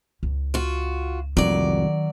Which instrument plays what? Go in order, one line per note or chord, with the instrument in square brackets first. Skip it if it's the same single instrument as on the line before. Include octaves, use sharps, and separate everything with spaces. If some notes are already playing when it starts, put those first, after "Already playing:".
[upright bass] C#2
[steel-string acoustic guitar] F4 F#4
[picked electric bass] C2 F2 [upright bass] D#3 C4 [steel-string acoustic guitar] F#3 D5